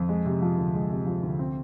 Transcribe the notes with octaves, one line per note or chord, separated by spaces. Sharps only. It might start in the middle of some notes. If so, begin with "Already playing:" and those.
Already playing: F2
G#3
C3
F3
D2
G#3
C3
F3
D2
C4